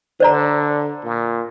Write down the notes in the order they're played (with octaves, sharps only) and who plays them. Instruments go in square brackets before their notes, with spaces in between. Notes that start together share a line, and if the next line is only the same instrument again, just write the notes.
[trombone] D3 [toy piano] C5 D5 A#5
[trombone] A#2